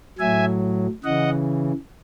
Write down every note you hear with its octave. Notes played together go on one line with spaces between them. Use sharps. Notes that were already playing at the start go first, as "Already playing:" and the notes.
A2 F#3 E5 G#5
C#3 E3 D#5 F#5